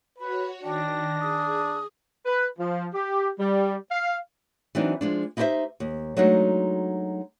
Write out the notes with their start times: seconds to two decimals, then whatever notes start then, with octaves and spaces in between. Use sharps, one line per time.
0.18 F#4 B4 C#5 B5
0.64 D#3 D4 G5 A#6
1.20 G#4 D#6
2.26 B4
2.58 F3
2.93 G4
3.39 G3
3.91 F5
4.75 E3 F#3 C4 D4 D#4
5.01 F3 G#3 D4
5.37 D#4 E4 G4 G#4 C5 E5
5.80 D#2
6.17 F#3 G#3 A3 D4 D#4 F#4